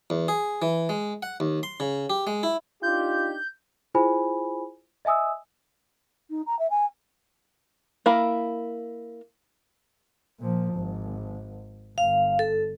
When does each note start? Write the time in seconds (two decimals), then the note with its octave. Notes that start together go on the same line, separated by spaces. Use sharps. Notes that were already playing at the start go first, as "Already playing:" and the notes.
0.10 E2
0.28 G#4
0.62 E3
0.89 G#3
1.23 F#5
1.40 D#2
1.63 C6
1.80 C#3
2.10 G4
2.27 G#3
2.43 E4
2.83 D4 D#4 F4 G4 G6
3.95 E4 F4 G#4 C5 G#5 B5
5.05 D#5 E5 G#5 D#6 E6
6.30 D#4
6.46 A#5
6.59 E5
6.70 G#5
8.06 A#3 E4 A#4 F5 B5
10.40 A#2 F3
10.74 G#1
11.98 G1 F5
12.39 A4